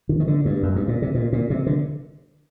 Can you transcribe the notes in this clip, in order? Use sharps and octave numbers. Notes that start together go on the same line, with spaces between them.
D#3
D#3
D3
G2
F#2
G2
A#2
C3
A#2
A#2
C3
D3